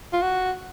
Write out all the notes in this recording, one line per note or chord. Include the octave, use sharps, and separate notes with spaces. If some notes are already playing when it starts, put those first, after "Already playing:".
F4
F#4